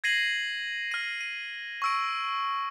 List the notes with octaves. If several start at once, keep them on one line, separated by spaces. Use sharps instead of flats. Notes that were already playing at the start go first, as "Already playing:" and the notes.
G#6 A#6 C7 D#7 F#7
F6 D#7
D#7
C#6 E6 D7